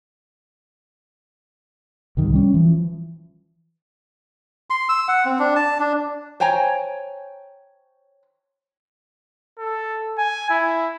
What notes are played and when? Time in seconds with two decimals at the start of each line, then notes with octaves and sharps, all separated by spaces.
2.17 C2 G#2 D#3 G3
2.34 G3 C#4
2.54 E3 F3
4.70 C6
4.89 E6
5.08 F#5
5.25 C4
5.39 D4
5.56 A5
5.80 D4
6.40 C5 C#5 G5 G#5 A#5
9.58 A4
10.18 G#5
10.50 E4